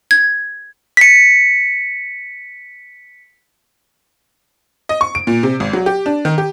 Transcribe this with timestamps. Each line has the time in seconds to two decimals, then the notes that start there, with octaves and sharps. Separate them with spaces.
0.11 G#6
0.97 B6 C#7
4.89 D#5
5.01 C#6
5.15 D7
5.27 A#2
5.43 C3
5.60 G#1
5.73 F#3
5.86 G4
6.06 D4
6.25 D#3
6.38 G4